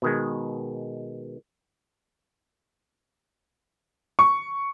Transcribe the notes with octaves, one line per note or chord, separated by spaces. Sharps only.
B2 D#3 G#3
C#6